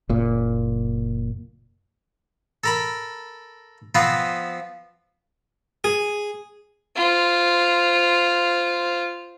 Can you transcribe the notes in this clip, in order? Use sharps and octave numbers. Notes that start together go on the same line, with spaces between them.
F#1 A#2
A4 A#4 B5
F3 B3 C4 F4 B4
G#4
F4 C5